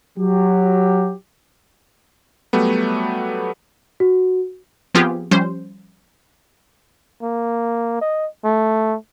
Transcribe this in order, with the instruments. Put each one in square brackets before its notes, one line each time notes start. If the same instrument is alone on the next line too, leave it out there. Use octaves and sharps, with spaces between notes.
[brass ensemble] F#3 G4
[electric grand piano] F#3 G3 A3 B3
[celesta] F#4
[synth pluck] F3 B3 C4 F4 G4 G#4
F3 G3 C#4 C5
[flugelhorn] A#3
D#5
A3